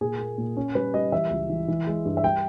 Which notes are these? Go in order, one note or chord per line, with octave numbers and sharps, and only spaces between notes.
A#2 G#4
A#3
A#2
C#4
G3 B4
G3 D#5
E3 E5
C#2
E3
E3
G#3
G2
E5
G3 G5